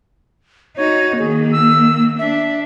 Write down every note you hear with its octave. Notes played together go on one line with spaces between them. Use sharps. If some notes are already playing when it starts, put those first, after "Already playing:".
D#4 F#4 C#5
D#3 A#3 G#4
E6
D4 E5